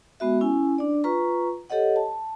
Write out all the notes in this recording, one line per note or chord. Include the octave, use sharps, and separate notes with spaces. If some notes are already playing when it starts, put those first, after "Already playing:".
G#3 B3 F#4 E5
C#4 E4 G#5
D4 D5
F4 B4 A#5 C#6
G4 A4 C#5 D#5 F#5
A5